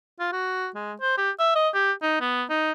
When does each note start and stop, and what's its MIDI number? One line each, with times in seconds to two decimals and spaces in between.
0.19 0.31 65
0.32 0.69 66
0.75 0.93 56
1.01 1.17 72
1.18 1.31 67
1.39 1.52 76
1.56 1.69 75
1.74 1.92 67
2.02 2.21 63
2.21 2.44 59
2.49 2.72 63